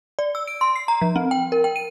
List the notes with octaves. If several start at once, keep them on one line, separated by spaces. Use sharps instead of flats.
D5
E6
D7
C6
C7
A#5
F3
C4
G5
A#4
G5
D#7